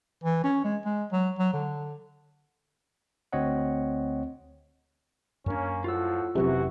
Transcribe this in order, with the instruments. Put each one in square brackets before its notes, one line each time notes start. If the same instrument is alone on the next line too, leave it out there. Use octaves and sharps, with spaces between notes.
[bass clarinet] E3
C#4
G#3
G#3
F#3
F#3
D3
[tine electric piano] D2 C4 C#5 D#5 F#5
[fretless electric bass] F#2 D4 [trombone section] A#3 C#4
[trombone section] A2 F3 F#4 [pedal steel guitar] F4 E6
[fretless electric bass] F1 F#3 C#4 [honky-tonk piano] C3 [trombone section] E3 F#4